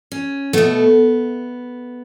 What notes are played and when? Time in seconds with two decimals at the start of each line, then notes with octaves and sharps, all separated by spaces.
0.12 C#4
0.53 B2 A3 B3